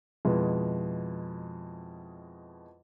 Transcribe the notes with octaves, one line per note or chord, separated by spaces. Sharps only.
F2 B2 G#3 B3 E4